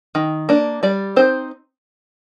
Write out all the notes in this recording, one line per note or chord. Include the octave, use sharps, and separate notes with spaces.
D#3
A#3 D4
G3 D5
C4 D#4 C5